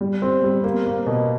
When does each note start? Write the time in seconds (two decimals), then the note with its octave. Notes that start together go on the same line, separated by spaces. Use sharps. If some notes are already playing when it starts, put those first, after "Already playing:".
0.01 G3
0.22 C4
0.43 G3
0.64 A#3
0.86 A#3
1.07 B2